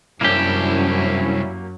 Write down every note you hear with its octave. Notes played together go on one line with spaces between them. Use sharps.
C2 F#2 F#3 A#3 C#4 D4 E4 G4